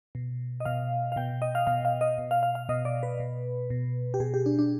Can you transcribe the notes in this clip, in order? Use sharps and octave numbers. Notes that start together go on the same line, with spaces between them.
B2
D#5
B2 F5
F5
B2 G5
D#5
F5
B2 F5
F5
D#5
B2
F5
F5
F5
B2 D#5
D5
B4
B2
B2
G4
B2 G#4
G4
D4
D4